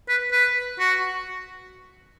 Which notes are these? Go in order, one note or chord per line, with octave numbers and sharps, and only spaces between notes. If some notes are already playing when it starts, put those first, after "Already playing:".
B4
B4
F#4